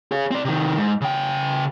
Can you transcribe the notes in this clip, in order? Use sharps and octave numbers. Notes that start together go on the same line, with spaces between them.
G#4 C#5
C4 D5
C3 D#3
G#2
C#3 G5